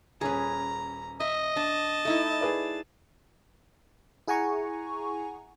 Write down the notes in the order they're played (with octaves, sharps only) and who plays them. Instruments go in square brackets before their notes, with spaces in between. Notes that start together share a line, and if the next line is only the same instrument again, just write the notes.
[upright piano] D#1 C#4 [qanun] G#4 B4 [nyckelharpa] A#5
[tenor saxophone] D#5 [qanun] E5
[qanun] D4 [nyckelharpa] A5
[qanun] A3 D#4 E4
[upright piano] G#4 B4 D5
[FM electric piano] E4 G#4 F#5 G#5 A#5 C#6